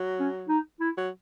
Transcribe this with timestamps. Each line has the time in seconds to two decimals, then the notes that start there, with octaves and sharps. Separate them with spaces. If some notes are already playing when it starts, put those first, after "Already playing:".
Already playing: F#3
0.20 C#4
0.49 D#4
0.80 E4
0.98 F#3